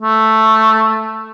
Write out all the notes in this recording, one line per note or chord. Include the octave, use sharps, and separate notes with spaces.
A3